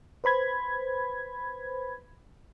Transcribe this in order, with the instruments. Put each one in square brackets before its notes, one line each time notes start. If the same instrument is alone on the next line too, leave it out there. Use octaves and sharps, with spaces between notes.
[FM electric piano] B4 C5 B5 G#6